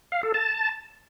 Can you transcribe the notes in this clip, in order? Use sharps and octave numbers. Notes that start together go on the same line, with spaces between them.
F5
A4
A5